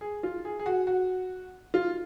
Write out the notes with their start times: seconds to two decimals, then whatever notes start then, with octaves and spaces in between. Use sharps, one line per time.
0.01 G#4
0.23 F4
0.45 G#4
0.59 G#4
0.66 F#4
0.87 F#4
1.74 F4